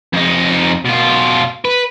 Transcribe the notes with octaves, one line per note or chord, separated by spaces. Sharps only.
F2 D#4
B2 F4
B4